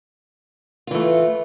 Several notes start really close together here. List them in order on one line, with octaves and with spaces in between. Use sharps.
F4 E3 A3